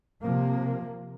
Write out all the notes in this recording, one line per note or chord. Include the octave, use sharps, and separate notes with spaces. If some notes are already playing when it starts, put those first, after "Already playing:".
C3 F3 A#3